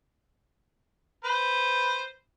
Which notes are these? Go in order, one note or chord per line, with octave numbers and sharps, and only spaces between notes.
B4 C5